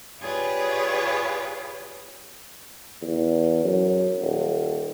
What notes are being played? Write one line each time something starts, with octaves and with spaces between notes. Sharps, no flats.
F4 G4 G#4 B4 C#5 D5
E2
F#2
D#1